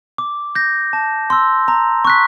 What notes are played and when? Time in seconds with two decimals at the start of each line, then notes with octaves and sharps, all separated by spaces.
0.18 D6
0.55 G6 A#6
0.93 A5
1.30 C6 E6
1.68 A#5
2.05 C#6 F#6 B6